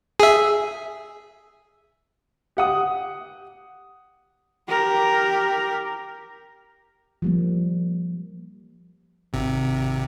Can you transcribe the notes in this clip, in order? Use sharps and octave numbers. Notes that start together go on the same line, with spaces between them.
G#4 E5
G4 F#5 D#6
G4 A#4
F3 G3 A#3
G#1 C3